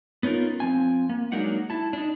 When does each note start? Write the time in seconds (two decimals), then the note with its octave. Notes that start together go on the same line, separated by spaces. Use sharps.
0.23 B3 C#4 D#4 F4 A#4
0.60 F3 C4 G#5
1.10 A#3
1.32 F#3 G#3 A#3 D4 D#4 F#5
1.70 E4 A5
1.93 D4 D#4